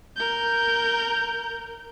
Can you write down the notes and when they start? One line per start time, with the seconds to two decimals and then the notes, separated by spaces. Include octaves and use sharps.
0.16 A#4 G6